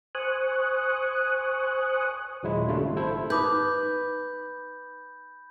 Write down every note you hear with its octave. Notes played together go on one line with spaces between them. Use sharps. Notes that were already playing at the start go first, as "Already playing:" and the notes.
C5 G#5 C#6 D#6 F#6
D#2 A#2 F#3 G#3 E4
C#3 G3 A3 D4 F4
G#1
E4 A4 C5
D#4 B4 B5 D6 D#6 G6